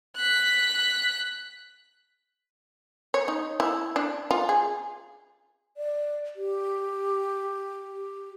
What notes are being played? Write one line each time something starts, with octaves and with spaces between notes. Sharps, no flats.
F#6 B6
C#5
D#4
E4
D4
F4
G#4
D5
G4